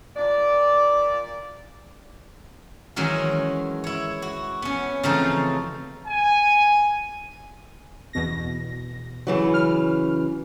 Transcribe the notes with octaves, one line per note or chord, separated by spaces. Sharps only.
A#2 D5
D#3 E3 F#3 G#3 C#4
E4 C#5
F#4
B3 C#4
C#3 E3 F3 A3 C4 D#4
G#5
E2 B2 A#6
C#3 E3 F#3
F6